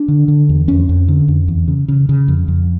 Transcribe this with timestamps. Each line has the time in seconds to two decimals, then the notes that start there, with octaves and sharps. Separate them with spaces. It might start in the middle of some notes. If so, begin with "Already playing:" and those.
Already playing: D4
0.08 D3
0.28 D3
0.49 E2
0.68 F2 C#4
0.89 F2
1.08 D3
1.28 F2
1.48 E2
1.68 C#3
1.88 C#3
2.09 C#3
2.28 F2
2.48 F2